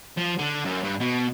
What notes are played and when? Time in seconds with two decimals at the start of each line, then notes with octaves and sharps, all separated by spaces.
0.17 F3
0.39 D3
0.65 F#2
0.84 G2
1.01 B2